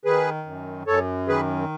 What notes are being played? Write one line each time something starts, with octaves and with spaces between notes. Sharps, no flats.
D#3 G#4 B4
F#2
F#2 A4 C#5
D#3 G#4 B4